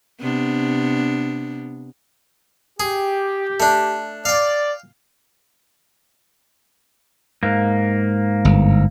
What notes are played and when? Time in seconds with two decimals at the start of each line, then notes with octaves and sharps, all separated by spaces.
0.20 C3 B3 D4
2.80 G4 G#4
3.60 A3 D4
4.25 D5 F5 G5
7.43 G#2 A#3
8.45 G1